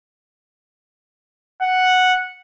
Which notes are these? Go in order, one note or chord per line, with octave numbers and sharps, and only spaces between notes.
F#5